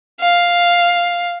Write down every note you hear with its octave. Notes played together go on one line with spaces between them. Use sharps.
F5